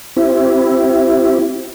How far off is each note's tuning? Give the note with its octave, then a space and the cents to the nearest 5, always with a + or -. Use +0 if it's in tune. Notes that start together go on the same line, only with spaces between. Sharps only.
C4 +0 E4 +10 G4 -25